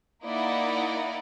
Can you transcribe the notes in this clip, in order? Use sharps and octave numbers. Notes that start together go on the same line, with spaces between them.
A#3 D#4 E4 D5 D#5 F#5